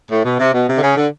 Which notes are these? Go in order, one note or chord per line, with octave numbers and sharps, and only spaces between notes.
A2
B2
C3
B2
C3
D3
C#3
D3